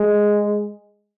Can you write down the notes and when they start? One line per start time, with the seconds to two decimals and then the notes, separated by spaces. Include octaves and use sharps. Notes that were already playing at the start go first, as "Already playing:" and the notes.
Already playing: G#3